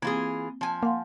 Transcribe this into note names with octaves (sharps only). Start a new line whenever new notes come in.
E3 A#3 C4 F4 G#4
F3 G#5
A#3 F5 F#5 C6